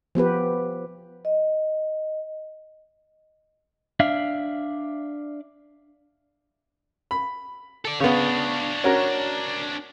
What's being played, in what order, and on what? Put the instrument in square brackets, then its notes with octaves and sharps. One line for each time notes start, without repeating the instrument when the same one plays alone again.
[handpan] F3 B3 G4 B4
[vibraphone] D#5
[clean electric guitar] D4 E5 F5
[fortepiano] B5
[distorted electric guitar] A4 D5
[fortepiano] C#3 B3 [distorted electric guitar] D4 C#5
[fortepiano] C#4 F#4 A#4